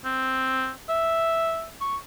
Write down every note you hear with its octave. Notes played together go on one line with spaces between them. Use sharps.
C4
E5
C#6